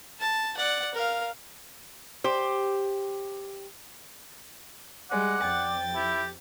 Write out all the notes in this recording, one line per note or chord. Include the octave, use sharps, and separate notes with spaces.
A5
D5 F#5
A#4 F5
G4 C5
G3 G#3 D5 F#5
F2 G5 A6
E4 G4